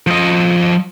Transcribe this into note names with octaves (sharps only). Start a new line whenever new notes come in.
F3 D#5